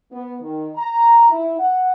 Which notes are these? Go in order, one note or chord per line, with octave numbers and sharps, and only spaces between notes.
B3
D#3
A#5
E4
F#5